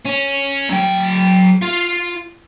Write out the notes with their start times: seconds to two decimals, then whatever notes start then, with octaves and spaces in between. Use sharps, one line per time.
0.05 C#4
0.69 F#3 G5
1.62 F4 F5